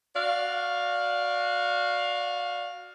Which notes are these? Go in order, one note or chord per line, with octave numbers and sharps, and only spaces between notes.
F#4 D5 F5